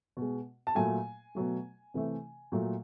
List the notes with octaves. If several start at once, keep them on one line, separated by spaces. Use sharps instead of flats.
B2
G#3
A5
A#2 F#3 A3 G#5
B2 F#3 A3
C3 E3 A3
A#2 F#3 A3